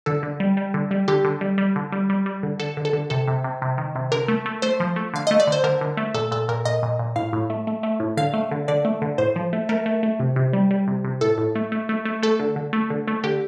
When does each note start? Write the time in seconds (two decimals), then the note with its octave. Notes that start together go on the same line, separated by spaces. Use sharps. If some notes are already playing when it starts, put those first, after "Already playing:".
0.06 D3 A4
0.23 D3
0.40 G3
0.57 G3
0.74 D3
0.91 G3
1.08 D3 G4
1.25 D3
1.41 G3
1.58 G3
1.76 D3
1.92 G3
2.09 G3
2.26 G3
2.43 D3
2.60 D3 A4
2.77 D3
2.85 A4
2.93 D3
3.10 C3 A4
3.28 C3
3.44 C3
3.62 C3
3.78 D#3
3.95 C3
4.12 D3 A#4
4.28 A3
4.46 A3
4.62 A3 C5
4.80 F3
4.96 A3
5.13 D3 F5
5.27 A3 D#5
5.40 D5
5.47 D3 C5
5.64 D3 A#4
5.81 D3
5.97 A3
6.14 A#2 A4
6.31 A#2 A4
6.48 A#2 A#4
6.65 A#2 D#5
6.83 A#2
6.99 A#2
7.16 A2 F5
7.33 A2
7.50 A3
7.67 A3
7.83 A3
8.00 A2
8.17 D3 F5
8.34 A3
8.51 D3
8.68 D3 D5
8.85 A3
9.02 D3
9.18 A2 C5
9.36 F3
9.53 A3
9.69 A3 A#4
9.86 A3
10.03 A3
10.20 C3
10.36 C3
10.53 G3
10.71 G3
10.87 C3
11.04 C3
11.21 A2 A4
11.38 A2
11.55 A3
11.72 A3
11.89 A3
12.05 A3
12.23 A3 A4
12.39 D3
12.56 D3
12.73 A3
12.90 D3
13.08 A3
13.24 D3 G4